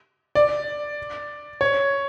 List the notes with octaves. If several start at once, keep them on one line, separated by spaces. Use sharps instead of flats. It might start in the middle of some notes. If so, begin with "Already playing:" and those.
D5
C#5